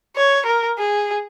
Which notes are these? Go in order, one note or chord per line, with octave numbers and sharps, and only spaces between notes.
C#5
A#4
G#4